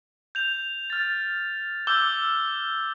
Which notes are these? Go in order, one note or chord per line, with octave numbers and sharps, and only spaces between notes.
G6 F7
F6 A6
D6 E6 F6 G6 G7